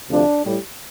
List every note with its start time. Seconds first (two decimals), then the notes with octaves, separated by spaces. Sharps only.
0.10 D2 C3 F3 A3 D4
0.45 A2 G3